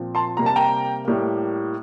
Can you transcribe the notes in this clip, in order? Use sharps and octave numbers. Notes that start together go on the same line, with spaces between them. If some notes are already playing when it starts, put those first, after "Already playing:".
Already playing: A#2 F3 C4
A5 C6
C3 G3 A#3 A#5
A5
G5 A#5
A2 G3 A#3